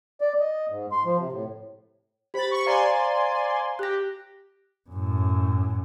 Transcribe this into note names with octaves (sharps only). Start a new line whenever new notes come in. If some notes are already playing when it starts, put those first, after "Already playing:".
D5
D#5
G#2
C6
F3
C3
A2
G4 C5 B5 A6
C#6
C5 D5 F5 G#5 A#5 C6
G4 F#6 A#6
F#2 A2